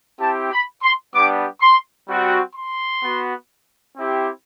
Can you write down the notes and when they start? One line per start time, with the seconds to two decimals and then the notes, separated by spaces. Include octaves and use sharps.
0.20 C4 E4 G4 A5
0.52 B5
0.83 C6
1.14 G3 B3 D4 G4 D6
1.61 C6
2.08 G3 C4 F#4
2.55 C6
3.02 B3 F#4
3.97 C4 E4 G4